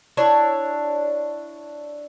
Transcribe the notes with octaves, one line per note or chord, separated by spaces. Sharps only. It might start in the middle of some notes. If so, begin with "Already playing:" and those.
D4 E4 C#5